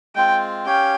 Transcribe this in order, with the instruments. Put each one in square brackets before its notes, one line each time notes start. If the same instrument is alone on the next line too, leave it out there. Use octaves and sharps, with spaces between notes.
[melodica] G#3 C4 F4 [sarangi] G5
[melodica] C#4 G4 C#5 F5 [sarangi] G5